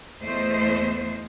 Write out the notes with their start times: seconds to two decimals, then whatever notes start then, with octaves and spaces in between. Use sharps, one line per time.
0.23 E2 A3 C5 D#5